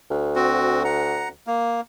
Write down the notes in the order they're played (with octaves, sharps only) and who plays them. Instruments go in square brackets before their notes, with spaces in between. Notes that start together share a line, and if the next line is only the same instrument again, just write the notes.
[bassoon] D2
[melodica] C4 F#4
F#5 A#5
A#3